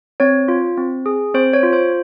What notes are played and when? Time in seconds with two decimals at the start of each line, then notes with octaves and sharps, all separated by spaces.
0.20 C4 C#5
0.48 F4
0.77 C4
1.06 G#4
1.34 C4 C5
1.53 C#5
1.63 F4
1.73 C5